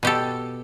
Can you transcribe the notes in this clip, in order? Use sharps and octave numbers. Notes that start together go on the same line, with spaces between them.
B2 G4 A4